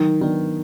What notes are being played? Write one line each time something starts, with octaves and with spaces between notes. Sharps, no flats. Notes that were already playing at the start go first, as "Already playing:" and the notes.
Already playing: D#3 F#3
D#3 B3 D4